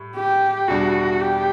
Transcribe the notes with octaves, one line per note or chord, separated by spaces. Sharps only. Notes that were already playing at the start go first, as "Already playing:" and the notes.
Already playing: A2 G3
G4
E2 B2 G3 D4 F#4
G4